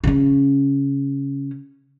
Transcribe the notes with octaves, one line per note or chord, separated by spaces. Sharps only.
C#3 C#4